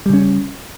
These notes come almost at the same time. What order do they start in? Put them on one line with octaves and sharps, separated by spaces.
G3 C#3 C#4